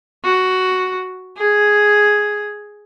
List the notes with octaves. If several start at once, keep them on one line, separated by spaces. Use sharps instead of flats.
F#4
G#4